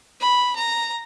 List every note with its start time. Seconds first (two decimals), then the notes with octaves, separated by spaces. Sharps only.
0.20 B5
0.56 A#5